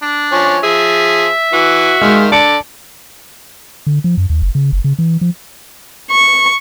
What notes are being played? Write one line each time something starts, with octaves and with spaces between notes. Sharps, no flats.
D4
F3 C#5 G#5
F3 G#4 E5
E3 F#4
D#3 G#3 F5
D3 D5 A5 C#7
D3
F3
F#2
D#2
F#1
C#3
F#1
C#3
E3
F3
C#6